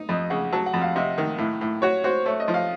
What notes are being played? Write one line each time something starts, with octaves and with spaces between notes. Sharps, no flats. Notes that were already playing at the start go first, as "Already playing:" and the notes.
Already playing: D#4
F2 D#5
C#3 F#5
F#3 A5
F#5
F2
F5
C3 D#5
D#3
A2
A2
F#4 C#5
F#4 C5
A3 C#5
D#5
F3
F5